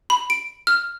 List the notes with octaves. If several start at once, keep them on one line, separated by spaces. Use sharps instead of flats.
B5
D7
F6